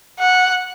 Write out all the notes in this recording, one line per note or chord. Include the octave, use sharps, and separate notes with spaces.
F#5